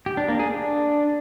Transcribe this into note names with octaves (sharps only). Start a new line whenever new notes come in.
G4
D4
A#3
G#4
D4